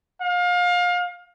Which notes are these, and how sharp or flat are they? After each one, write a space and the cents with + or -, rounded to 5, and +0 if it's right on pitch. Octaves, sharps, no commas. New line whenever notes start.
F5 +30